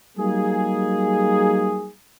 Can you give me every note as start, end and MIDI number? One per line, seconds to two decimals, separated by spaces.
0.18 1.91 54
0.18 1.91 55
0.18 1.91 58
0.18 1.91 63
0.18 1.91 68